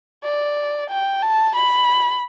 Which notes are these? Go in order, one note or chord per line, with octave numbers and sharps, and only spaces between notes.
D5
G5
A5
B5